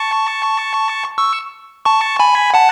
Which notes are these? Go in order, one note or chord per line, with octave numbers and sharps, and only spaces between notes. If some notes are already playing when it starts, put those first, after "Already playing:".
Already playing: A5 C#6
C#6 E6
A5 C#6
G#5 B5
F#5 A5